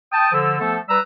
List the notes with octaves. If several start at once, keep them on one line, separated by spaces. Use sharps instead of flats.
G5 A5 D#6
D3 F3 E6
F3 A3 B3 A4
G3 B4 A#5 E6